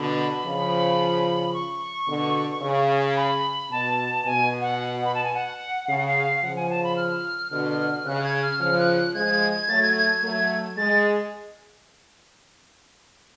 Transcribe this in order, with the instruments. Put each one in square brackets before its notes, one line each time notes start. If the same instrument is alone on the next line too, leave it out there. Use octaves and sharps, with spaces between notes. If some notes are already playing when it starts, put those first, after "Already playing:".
Already playing: [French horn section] B2 D3 [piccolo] B5
[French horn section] C#3 F3
[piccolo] C#6
[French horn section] B2 D3
C#3
[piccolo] B5
[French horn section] B2 [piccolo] A5
[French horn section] B2 [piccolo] G#5
[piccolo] F#5
B5
A5
G#5
F#5
[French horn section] C#3 [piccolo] F5
[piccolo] F#5
F5
[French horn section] C#3 F3 [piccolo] F#5
[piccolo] G#5
A5
B5
F6
[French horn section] B2 D3 [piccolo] F6
[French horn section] C#3 [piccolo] F#6
[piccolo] G#6
F6
[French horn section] C#3 F3 [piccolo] F6
[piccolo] F#6
F#6
[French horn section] F3 G#3 [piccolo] G#6
[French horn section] F#3 A3 [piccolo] A6
[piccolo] G#6
G#6
G#6
[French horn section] F#3 A3
[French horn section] G#3 [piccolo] A6